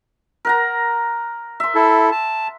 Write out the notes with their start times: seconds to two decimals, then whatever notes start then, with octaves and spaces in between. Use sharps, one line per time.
0.45 A#4 F#5 A#5
1.60 E5 C6
1.75 E4 A4
2.11 A5